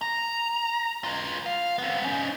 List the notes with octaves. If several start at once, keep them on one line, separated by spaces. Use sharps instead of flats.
A#5
F4 B4
F5
B3 C4
C#4 D#4